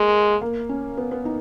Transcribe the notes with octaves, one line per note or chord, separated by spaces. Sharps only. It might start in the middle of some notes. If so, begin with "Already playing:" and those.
Already playing: G#3 A#3
A#3
C#4
B3
B3
D#4